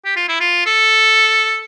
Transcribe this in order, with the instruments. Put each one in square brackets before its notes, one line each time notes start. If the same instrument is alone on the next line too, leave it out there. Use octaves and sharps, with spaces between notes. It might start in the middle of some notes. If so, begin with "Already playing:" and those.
[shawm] G4
F4
E4
F4
A4